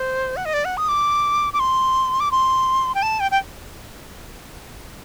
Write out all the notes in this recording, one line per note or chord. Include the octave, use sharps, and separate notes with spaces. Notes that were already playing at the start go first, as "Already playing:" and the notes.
Already playing: C5
F#5
D#5
D5
F#5
D#6
D6
D6
C6
D6
C6
G5
A5
G5
G5